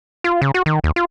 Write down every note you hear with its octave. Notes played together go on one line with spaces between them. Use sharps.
F4
C#3
F#4
D#3
D#2
F4